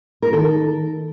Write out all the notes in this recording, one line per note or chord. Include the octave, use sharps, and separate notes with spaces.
A#4
D#3 A4